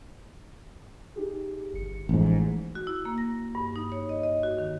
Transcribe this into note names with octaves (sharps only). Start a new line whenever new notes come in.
D#4 G4 G#4
G1 C#7
A1 G#2 E3 F3
F#4
E4
A#3
A#6
G2
D#4
C#5
D#5
D#5
F#4
D#3